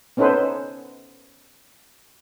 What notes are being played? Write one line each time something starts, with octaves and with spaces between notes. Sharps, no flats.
B3 C#4 D#4 A4 B4 C5